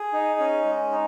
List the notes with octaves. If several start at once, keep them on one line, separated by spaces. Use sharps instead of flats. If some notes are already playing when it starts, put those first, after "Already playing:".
Already playing: G#4
D#4
C#4
G#3
D#4